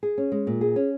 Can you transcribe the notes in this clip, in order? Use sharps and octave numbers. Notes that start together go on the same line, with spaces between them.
G#4
C#4
G#3
A#2
G#4
C#4